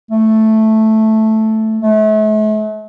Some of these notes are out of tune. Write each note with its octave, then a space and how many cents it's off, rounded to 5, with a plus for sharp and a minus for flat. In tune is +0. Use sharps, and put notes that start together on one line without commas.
A3 -5
A3 -40